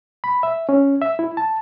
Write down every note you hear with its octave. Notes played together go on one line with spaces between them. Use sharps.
B5
E5
C#4
E5
E4
A5